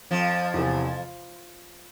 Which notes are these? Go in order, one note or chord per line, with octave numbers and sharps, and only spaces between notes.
F2 F3
E2 C3 E3